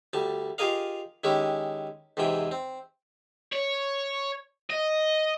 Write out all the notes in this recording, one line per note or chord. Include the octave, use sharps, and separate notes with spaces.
D2 G3 A5
F4 G4 G#4 A#4 D#5 F5
D#3 G#3 C#4 E4 G4
E2 G#2 C3 E3 G5
C4
C#5
D#5